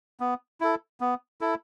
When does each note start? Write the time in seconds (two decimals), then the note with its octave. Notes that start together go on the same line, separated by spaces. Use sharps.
0.20 B3
0.61 E4 A4
1.00 B3
1.41 E4 A4